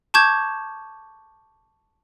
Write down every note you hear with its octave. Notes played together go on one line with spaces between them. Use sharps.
A5 C#6 D6 G6 G#6 E7